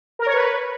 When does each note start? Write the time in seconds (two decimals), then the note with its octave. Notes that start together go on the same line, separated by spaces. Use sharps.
0.19 A#4
0.26 C#5
0.34 B4